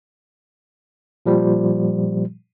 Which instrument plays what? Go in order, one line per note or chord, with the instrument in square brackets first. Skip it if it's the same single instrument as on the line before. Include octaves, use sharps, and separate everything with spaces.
[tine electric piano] A#2 F3 G3